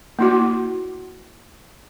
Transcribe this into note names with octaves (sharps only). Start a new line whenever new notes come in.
A#3 E4 F#4